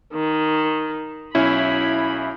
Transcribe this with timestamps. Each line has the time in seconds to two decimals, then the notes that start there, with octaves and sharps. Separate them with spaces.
0.13 D#3
1.35 B1 C#4 E4 B5